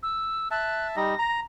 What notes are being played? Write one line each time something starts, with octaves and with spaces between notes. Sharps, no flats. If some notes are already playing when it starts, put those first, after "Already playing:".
E6
E5 A5 F#6
G3 D#4 A#6
A#5